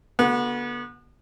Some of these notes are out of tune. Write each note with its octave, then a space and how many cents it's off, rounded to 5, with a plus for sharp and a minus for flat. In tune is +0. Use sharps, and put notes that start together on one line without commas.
D3 -15 B3 -30 F#4 +0